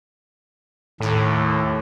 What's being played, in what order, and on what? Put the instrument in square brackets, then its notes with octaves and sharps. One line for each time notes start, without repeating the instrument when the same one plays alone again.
[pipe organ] D#2 [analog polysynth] A2